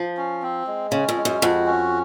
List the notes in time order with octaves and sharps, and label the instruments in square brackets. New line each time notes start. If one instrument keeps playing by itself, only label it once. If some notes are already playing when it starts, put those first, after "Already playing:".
Already playing: [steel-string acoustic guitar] F3
[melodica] C#4
C4
G#3
[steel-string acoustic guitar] C#3 [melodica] C#4
[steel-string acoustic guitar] F2
[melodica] G#3
[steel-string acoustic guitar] F#2
[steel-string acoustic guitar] F2 [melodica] F#4
[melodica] C#4